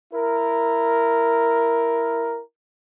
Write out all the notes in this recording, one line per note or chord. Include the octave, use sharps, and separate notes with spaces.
E4 A#4